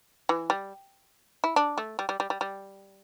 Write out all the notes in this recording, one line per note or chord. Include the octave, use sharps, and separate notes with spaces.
E3
G3
E4
D4
A3
G3
G3
G3
G3
G3